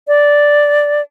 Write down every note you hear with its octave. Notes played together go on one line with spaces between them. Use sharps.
D5